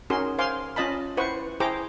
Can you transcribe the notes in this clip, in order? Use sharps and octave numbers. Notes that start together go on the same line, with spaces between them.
C#4 D#4 F#4 G#4 A#4 C6
C5 F5 G#5 C6 D6
C#4 F4 D#5 A5 B5
E4 B4 C5 F#5 C#6
E4 G#4 C5 G5 A#5 D6